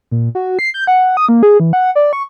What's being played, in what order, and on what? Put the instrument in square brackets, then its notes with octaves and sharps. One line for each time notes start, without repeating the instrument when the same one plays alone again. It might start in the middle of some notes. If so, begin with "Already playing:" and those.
[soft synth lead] A#2
F#4
C7
G6
F#5
D#6
A#3
G#4
E3
F#5
D5
C#6